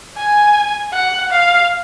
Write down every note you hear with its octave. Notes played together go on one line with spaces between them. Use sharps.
G#5
F#5
F5